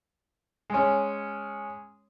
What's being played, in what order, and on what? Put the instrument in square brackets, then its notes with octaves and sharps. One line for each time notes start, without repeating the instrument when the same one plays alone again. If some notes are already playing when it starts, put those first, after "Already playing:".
[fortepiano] G#3 C#4